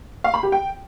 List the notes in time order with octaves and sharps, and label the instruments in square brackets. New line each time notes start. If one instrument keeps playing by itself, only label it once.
[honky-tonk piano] F5
B5
G4
G5